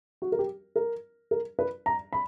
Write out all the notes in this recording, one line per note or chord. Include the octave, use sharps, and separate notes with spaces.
F#4
A#4
G4
A#4
A#4
B4
A#5
B5